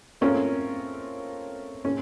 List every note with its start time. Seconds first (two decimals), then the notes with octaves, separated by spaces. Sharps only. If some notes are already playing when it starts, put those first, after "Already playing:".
0.21 A3 C4 C#4 F4 A#4 C#5
1.85 C#4